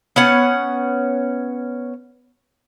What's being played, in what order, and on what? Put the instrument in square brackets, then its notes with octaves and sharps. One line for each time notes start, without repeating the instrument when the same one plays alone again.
[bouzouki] B3 C#4 F#5